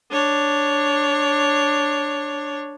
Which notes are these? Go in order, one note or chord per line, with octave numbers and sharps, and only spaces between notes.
D4 C#5